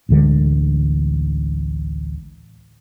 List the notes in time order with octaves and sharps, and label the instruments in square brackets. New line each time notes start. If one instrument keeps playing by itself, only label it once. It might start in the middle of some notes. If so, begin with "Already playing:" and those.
[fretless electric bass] A1 D2 D3 G#3